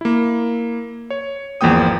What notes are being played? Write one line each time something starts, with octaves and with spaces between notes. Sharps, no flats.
A#3 E4
C#5
G#1 E2 F3 A#3 G5 D#6